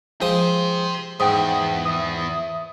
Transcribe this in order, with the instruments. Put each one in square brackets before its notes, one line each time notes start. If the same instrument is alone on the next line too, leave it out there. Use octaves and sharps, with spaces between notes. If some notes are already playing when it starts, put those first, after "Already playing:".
[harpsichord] F3 G#3 D#6 [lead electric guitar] G4 C5
[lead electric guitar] E2 [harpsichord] G#2 [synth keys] F#5 G5 D#6
[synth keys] E5 D#6